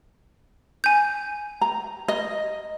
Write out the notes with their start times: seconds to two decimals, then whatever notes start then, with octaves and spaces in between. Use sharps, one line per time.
0.84 G#5 G6
1.61 A#5
2.08 D#5